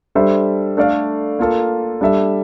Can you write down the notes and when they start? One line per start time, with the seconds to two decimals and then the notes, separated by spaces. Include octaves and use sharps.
0.15 G3 D4 A4 C5 E5
0.77 A3 D4 A4 D5 F5
1.39 A#3 F4 A4
2.01 G3 D4 A4 E5